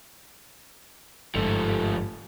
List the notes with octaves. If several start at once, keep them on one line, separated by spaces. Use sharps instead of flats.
G1 G#2 F3 A3